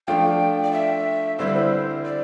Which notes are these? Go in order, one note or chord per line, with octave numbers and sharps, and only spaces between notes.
F3 A3 D4 F4 G5
D5
E5
D3 G3 C4 E4 C5
B4
C5
D5